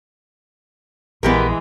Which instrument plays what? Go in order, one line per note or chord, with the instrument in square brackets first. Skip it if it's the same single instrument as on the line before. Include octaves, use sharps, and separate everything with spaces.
[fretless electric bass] A#1 [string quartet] E3 G#3 [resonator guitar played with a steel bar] B3 G4 A#4